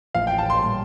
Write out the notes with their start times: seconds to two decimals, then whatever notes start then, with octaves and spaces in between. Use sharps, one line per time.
0.15 A1 A2 F3 A#3 F5
0.27 G5
0.38 A5
0.50 C6
0.61 A#2 G3 A#3